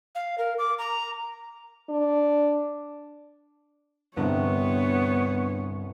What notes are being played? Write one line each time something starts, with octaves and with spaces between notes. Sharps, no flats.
F5
A#4
D6
A#5
D4
C2 G2 D3 B3 C#5 A#5